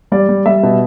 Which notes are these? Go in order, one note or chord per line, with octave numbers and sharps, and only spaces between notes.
G3 D5
G3
G3 E5
B2